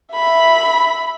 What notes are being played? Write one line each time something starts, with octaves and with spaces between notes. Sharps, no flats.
E5 B5